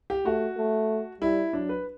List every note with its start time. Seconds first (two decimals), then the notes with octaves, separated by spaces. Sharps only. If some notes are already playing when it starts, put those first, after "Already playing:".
0.10 G4
0.25 A3 F#4
0.57 A3
1.21 G3 E4
1.53 F#3 D4
1.69 B4